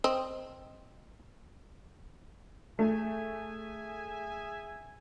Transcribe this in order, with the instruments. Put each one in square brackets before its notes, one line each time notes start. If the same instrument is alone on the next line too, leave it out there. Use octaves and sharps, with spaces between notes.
[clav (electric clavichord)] C4 [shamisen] D#5
[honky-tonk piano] A3 [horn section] G#4 E5 G#5